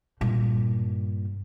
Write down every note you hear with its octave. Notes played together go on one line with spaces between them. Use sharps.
G2 A#2